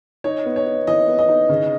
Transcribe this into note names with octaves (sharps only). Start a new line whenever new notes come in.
D#4 C#5
B3
C#5
D#4
E3 D#5
B3
D#5
D#4
C#3